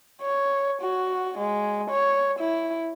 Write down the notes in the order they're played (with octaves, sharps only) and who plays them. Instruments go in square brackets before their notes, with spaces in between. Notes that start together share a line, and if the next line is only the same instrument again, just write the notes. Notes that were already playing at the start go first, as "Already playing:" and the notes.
[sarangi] C#5
F#4
G#3
C#5
E4